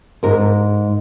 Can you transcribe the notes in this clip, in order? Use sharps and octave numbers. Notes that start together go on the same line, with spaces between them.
G#2 A#4